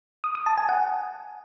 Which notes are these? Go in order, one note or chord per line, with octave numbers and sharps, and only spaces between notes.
D#6
D#6
A5
G#5
F#5